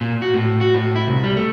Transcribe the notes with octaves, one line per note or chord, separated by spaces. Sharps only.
A#2
F#4
A2
F#4
A2
E4
C2
G3
A3